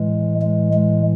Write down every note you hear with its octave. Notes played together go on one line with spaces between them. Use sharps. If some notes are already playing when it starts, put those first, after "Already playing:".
Already playing: A2 E3 G#3
G#3
G#3